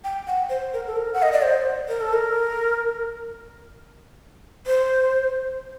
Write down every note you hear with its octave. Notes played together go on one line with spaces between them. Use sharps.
G5
F#5
C5
A#4
A4
A#4
F#5
D#5
D5
C5
A#4
A4
A#4
C5